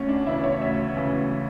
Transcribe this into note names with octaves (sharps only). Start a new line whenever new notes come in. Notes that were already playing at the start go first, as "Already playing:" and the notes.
Already playing: D2 C#4
D4
C#3 E3 E4
C#5
D2 E5
C#3 E3